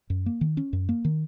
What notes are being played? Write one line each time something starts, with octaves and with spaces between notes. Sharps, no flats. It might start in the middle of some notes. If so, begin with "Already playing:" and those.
F#2
A#3
D#3
C#4
F#2
A#3
D#3